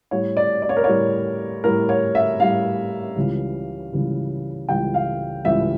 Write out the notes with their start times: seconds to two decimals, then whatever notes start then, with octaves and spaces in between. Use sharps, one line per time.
0.11 A2 G3 C#5
0.37 D5
0.62 D5
0.69 C#5
0.77 A#4
0.84 A2 G3 C#5
1.64 A2 G3 A#4
1.89 C#5
2.15 E5
2.40 A2 G3 F5
3.16 C#2 C#3 E3 G3
3.92 C#2 C#3 E3 G3
4.69 C#2 C#3 E3 G3 G5
4.94 F5
5.45 C#2 C#3 E3 G3 E5